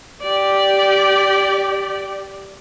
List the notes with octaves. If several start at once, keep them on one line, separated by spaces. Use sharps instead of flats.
G4 D5